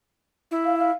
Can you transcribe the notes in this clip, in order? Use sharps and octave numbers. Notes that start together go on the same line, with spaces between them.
E4
F5
F5